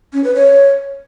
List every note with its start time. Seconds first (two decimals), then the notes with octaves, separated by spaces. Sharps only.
0.13 C#4
0.24 B4
0.35 C#5